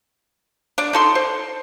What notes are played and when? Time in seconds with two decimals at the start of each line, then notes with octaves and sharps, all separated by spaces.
0.78 D4 D5
0.93 D#4 A4 C6
1.15 C5